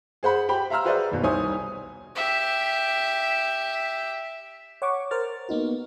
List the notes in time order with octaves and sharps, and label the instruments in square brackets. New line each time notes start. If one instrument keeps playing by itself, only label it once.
[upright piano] G#4 C5 F#5 B5
G4 C5 G5 B5
E5 F5 A#5 C6 E6 F6
F#4 G#4 B4 C5 D5 E5
D#2 B2
C2 D#4 C5 C#5 G#5 D#6
[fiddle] G4 E5
[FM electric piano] C#5 F#5 C#6 D6
A#4 C5 F6 A6
A#3 B3 D#4 F#4